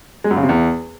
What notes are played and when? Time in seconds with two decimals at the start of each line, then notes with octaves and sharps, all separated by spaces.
0.24 G#3
0.31 F#2
0.37 C#3
0.43 C3
0.49 E2